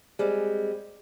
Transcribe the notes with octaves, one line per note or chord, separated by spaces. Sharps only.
G3 G#3 C4